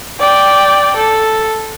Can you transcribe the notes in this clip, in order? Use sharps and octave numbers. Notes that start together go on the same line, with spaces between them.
D5 G5
A4